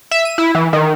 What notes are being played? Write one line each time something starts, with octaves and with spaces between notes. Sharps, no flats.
E5
D#7
E4
E3
D#3